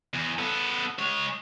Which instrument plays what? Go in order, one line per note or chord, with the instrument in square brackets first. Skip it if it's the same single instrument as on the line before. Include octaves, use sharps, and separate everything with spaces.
[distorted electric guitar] E2
B3 A4
G#3 C#5